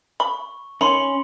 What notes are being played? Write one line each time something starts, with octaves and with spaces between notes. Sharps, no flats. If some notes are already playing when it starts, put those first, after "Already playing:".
B5 C#6
D#3 C#4 B5 C6 C#7